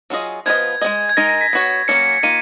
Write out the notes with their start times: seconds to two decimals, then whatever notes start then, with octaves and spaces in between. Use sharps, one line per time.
0.10 F#3 C#4 F4 G#4 D#5
0.46 F3 B3 F4 B4 D#5 G#6
0.81 G#3 C#4 G#4 D#5
1.09 G#6
1.17 G#3 D#4 A#4 A#6
1.29 A#6
1.41 B6
1.53 B3 F#4 C#5
1.88 F#3 A#3 C#4 C#7
2.23 D#3 A#3 F4 D#7